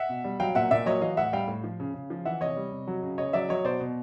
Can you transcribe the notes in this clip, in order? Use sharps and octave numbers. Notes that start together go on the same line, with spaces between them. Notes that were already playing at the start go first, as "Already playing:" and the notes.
Already playing: E5 F#5
B2
G3
F#3 F5 G5
A#2 E5 F#5
A#2 D5 E5
F#3 C#5 D#5
E3 D#5 F5
A2 E5 F#5
G3 F5 G5
A2
F3
C#3
C#3
F3
E3 E5 F#5
C3 C#5 D#5
G3
C3
F#3
C#3
C#3 C#5 D#5
F#3 D5 E5
F#3 C#5 D#5
B2 C5 D5
B2